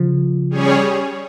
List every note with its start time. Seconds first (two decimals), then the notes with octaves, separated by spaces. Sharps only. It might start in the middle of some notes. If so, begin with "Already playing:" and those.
Already playing: C#3 F3
0.50 G3 C#4 G#4 C#5